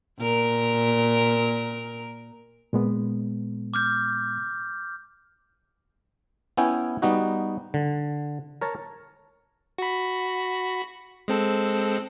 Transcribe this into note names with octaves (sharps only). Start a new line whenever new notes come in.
A#2 A#4
A#2 G#3 B3
D6 F6 G6
B3 C#4 E4 G5 G#5
G3 B3 D#4 F#4
D3
A#4 C#5 A5
F#4 B5
G#3 C4 A4